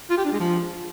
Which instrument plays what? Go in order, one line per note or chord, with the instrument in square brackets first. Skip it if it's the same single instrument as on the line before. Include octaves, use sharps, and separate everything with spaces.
[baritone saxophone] F4
G4
D4
G#3
F3